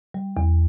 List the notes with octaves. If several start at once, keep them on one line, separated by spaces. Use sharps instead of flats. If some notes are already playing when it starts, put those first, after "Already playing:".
G3
E2